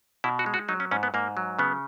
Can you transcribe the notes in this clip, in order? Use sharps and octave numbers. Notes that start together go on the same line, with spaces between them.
B2 E4
F#4
G#3
F#4
F#3 D#4
C#4
G#2 C#4
B3
G#2 A#3
F#3
C#3 B3